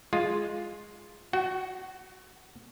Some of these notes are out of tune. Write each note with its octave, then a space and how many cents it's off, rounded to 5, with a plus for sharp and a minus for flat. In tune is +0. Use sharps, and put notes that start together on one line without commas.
G#3 +0 F4 +0
F#4 +0 F#5 +35